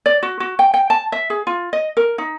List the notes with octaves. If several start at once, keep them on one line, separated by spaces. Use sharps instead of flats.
D5
F#4
F#4
G5
G5
A5
E5
G#4
F4
D#5
A#4
D#4